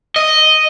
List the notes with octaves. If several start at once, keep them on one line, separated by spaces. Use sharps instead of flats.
D#5